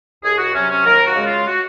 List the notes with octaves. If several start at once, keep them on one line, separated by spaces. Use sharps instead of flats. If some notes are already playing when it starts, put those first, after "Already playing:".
C2 G#4
F#4
C3 F#3 C#4
C#4
D#2 A#4
F#4
C#3 G#3
F4
F#4